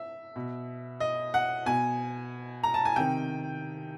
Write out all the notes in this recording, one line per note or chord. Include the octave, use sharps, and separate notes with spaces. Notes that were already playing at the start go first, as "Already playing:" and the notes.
Already playing: E5
B2
D#5
F#5
B2 G#5
A#5
A5
G#5
C3 D#3 G5